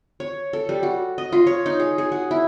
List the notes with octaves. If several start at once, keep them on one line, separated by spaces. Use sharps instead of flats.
C#5
A4
G3
F#4
D#5
F4
C#5
D#4
G#4
G#4
F#4
E4